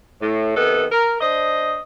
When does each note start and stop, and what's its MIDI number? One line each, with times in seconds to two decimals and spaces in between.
0.21 0.54 45
0.56 0.85 48
0.56 0.85 51
0.56 0.85 59
0.56 0.85 69
0.90 1.16 70
1.21 1.78 62
1.21 1.78 72
1.21 1.78 75